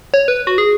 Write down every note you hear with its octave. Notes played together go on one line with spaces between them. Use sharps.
C#5
B4
F#4
G#4